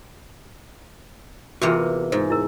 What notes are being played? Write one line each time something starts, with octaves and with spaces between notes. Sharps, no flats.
E2 C3 A#3 F4 F#4
G#2 C5
E4 A#4